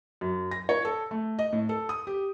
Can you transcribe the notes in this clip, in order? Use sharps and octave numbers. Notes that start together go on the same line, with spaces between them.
F#2
A#6
C#5
A4
A3
D#5
A2
A4
D#6
G4